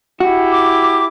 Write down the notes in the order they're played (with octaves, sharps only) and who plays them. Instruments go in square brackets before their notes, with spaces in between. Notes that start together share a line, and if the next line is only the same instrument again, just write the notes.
[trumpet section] E4 G4 [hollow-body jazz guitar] F#4
[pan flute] D6